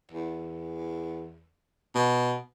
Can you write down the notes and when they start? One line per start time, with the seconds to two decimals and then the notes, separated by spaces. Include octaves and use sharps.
0.11 E2
1.95 B2